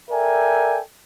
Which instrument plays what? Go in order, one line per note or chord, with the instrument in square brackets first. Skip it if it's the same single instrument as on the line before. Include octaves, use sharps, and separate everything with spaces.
[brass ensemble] A4 A#4 D5 E5 G5 G#5